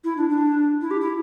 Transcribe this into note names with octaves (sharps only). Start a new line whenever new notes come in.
E4
D4
D4
E4
G4
E4